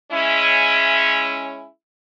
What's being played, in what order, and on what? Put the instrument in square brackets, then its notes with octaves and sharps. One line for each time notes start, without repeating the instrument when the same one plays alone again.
[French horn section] G#3 C#4 E4